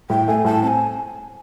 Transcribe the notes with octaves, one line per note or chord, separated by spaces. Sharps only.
A2 G5
A3 G#5
A2 A5
C4 G#5 A5